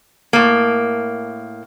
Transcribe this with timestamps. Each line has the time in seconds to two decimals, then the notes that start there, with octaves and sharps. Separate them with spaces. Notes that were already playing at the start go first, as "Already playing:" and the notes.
0.33 A2 A#3